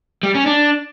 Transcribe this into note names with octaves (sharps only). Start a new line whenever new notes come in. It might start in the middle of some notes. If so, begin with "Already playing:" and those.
G3
C#4
D4